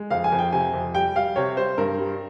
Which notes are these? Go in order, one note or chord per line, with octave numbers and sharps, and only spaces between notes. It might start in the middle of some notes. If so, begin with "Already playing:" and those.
Already playing: G#3
F2 F5
G#5
F2
G5
C3 G#5
F2
G3 G5
G3 F5
C3 C#5
G3 C5
G2 A#4
G3